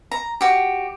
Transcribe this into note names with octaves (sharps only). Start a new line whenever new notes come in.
A#5
F#4 G4